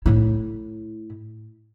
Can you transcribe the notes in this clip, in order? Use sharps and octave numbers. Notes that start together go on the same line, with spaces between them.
A2 E4